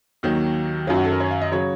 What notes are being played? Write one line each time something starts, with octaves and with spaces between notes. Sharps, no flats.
D#2 D#3 F#3
F#2 D#3 F#3 F4
F#4
A4
A#4
C#5
F5
D#5
C#3 F#3 C#5